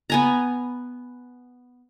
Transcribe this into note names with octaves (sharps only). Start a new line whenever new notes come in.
B3 G#5 A#5